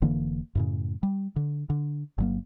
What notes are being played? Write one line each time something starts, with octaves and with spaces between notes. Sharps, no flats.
F1 D3 E3 A#3
F#2 A2 C#3
G3
D3
D3
G1 F#3 A#3